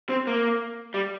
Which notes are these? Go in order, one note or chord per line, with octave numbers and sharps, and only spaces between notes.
C4
A#3
G3